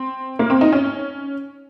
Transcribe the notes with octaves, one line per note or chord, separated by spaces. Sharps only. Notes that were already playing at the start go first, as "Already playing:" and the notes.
Already playing: C4
A#3
C4
D#4
C#4